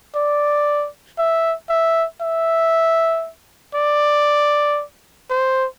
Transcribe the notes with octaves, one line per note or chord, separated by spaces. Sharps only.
D5
E5
E5
E5
D5
C5